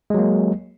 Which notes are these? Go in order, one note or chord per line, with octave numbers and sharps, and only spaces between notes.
F#3 G#3 A#3